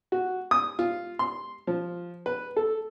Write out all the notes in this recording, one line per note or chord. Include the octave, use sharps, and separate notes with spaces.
F#4
D#6
F4
C6
F3
B4
A4